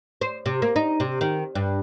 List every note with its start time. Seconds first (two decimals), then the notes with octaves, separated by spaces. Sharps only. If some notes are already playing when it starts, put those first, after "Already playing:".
0.21 C5
0.46 C3
0.62 A#3
0.76 D#4
1.00 C3
1.21 D#3
1.55 G2